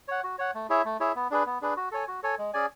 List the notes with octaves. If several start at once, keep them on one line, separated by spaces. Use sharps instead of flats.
C#5 F#5
F#4
C#5 F#5
A3
E4 G#4 C#5 E5
A3
E4 G#4 C#5 E5
B3
D4 G#4 B4
B3
D4 G#4 B4
F#4
A4 C#5 G#5
F#4
A4 C#5 G#5
G#3
C#4 G#4 D5 G#5